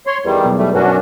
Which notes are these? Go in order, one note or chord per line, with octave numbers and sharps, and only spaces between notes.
C#5 C6
E2 D#3 G3
B1
G3 A3
F#2 C#4 D4 F#4